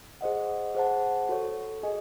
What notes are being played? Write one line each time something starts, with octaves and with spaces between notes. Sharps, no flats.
G#4 C5 D#5 F#5
G#4 C5 F#5 A5
F#4 A4 C#5
G#4 D#5 G#5